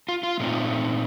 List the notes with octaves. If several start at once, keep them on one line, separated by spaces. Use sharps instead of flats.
F4
F4
A#2 A3 C4 D#4